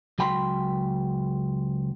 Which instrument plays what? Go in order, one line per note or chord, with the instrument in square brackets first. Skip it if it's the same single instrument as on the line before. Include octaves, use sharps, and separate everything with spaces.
[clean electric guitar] C#2 F#3 G5 B5 C6